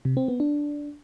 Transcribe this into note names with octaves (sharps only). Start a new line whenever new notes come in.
C3
C4
B3
D4